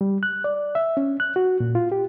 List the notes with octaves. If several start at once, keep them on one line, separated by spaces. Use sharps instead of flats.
G3
F#6
D5
E5
C#4
F#6
F#4
A#2
F4
G4